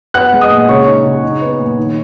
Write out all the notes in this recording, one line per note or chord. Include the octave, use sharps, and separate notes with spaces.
B3 F#5 F#6
G#3
D#5 D#6
A#2
C#3 C#5 C#6
D#4
C#3
D#4
B3
A#2
D#3